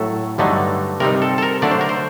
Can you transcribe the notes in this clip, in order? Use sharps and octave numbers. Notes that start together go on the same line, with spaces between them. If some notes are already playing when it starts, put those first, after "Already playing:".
Already playing: A2 F#3 A3 A4
G2 D3 F#3 A3 D#4
C3 G3 C4 D#4 A#4
A4
A4
A#4
D3 F#3 A3 D4 D5
C5
A#4
C5